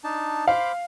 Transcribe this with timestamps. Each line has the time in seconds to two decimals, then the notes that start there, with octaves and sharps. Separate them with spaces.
0.04 D4 D#4 A5
0.47 C5 F5 B5 D6